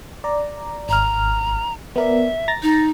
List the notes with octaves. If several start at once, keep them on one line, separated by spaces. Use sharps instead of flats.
D5 A#5
G#1 A#5 F6
B3 A#4 D5 E5
A#5 A6 A#6
D#4